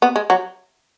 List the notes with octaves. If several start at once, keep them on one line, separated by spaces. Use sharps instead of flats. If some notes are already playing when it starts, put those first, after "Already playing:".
B3
G#3
F#3